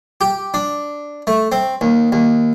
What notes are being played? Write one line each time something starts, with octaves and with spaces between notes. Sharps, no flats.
G4
D4
A3
C4
D#2
D#2